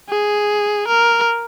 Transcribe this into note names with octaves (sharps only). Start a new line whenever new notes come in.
G#4
A#4